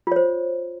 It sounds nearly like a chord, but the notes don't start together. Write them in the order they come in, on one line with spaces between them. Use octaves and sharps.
F4 C#5 C5